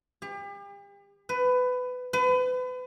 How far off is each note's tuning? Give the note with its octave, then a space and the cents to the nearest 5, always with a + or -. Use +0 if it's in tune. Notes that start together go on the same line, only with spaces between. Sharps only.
G4 +40
B4 +20
B4 +35